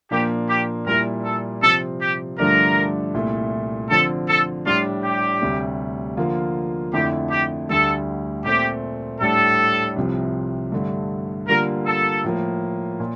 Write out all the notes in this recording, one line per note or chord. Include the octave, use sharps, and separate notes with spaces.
A#2 F3 A#3 D4 G4
G4
A#2 G3 A#3 E4 A#4
A4
C3 F3 C4 A4
G4
G2 D3 F3 A3 D4 A#4
C2 A#2 A3 E4
D3 F3 C4 A4
A4
A2 G3 D4 F4
G4
D2 C3 G3
D3 F3 A#3 F4
F2 D3 A3 E4 G4
G4
D2 D3 G3 A4
A#2 A3 C4 G4
A2 G3 D4 A4
C2 C3 F3
G2 D3 A3
D3 G3 A#3 F4 A#4
A4
A2 F3 A#3
A#2